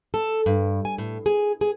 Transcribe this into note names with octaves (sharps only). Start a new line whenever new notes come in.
A4
G2
G#5
A2
G#4
G#4